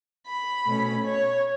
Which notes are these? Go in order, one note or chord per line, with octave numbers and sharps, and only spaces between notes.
B5
B2 A3 C#4
C#5